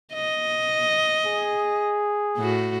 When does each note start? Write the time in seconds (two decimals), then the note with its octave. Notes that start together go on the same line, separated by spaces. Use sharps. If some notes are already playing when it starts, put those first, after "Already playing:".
0.13 D#5
1.26 G#4
2.38 A2 F#4